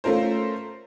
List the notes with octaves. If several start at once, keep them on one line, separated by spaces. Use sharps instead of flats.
A3 C#4 F4 A#4 C5